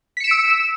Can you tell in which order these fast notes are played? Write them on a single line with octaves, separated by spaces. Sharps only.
B6 C#7 E7 D7 E6